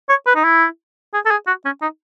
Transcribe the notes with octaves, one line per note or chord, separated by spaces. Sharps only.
C#5
B4
D#4
E4
G#4
A4
G#4
F#4
C#4
D#4